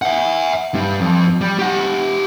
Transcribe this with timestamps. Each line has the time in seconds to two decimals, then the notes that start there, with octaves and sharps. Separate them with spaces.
0.02 E5 F#5
0.75 G2 G3
1.01 F2
1.41 G3
1.59 G4 F#5